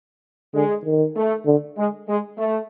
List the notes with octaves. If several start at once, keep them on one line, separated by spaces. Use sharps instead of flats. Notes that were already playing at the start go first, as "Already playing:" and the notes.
D3 G#3
D#3
A3
D3
G#3
G#3
A3